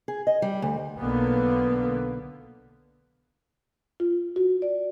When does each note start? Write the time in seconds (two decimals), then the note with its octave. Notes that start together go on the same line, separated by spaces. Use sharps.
0.08 G#4
0.27 D#5
0.42 G3
0.62 D2
0.99 B1 D3 A#3 B3
4.00 F4
4.36 F#4
4.62 D5